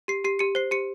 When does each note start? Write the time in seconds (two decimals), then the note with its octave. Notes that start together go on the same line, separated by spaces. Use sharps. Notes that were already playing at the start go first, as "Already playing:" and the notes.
0.08 G4 C7
0.24 G4 C7
0.39 G4 C#7
0.55 C5 C7
0.71 G4 C#7